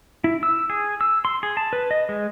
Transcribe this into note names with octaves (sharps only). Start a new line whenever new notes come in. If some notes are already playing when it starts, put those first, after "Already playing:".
E4
E6
G#4
E6
C6
G#4
A5
B4
D#5
G#3